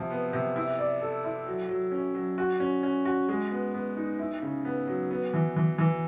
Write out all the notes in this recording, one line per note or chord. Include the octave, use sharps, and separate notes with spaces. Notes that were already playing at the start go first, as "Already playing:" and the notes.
Already playing: C3 F3
B3
C3
E4
D5
A4
E4
F#3
F#3
C#4
F#3
F#4
C#4
C#4
F#4
G#3
B3
B3
D#4
E4
C#3
B3
F#3
B3
E3
E3
E3